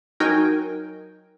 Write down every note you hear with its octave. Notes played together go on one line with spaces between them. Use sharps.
F#3 D#4 A#4 G5 G#5